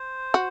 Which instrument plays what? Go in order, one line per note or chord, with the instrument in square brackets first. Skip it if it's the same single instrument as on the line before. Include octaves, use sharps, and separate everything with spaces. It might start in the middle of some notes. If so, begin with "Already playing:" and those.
Already playing: [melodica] C5
[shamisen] F#4